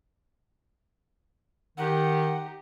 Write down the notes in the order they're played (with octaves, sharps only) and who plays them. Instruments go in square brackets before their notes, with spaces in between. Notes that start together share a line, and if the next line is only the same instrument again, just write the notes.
[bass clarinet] D#3 [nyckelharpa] D#4 G4 [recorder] F#5